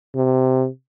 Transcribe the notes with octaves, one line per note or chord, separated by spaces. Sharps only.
C3